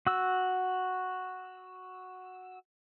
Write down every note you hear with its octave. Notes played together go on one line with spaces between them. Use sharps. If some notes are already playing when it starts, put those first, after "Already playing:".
F#4 E6